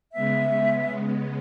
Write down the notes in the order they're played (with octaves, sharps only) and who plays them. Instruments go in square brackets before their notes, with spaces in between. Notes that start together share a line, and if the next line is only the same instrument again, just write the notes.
[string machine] C#3 G#3 B3 [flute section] E5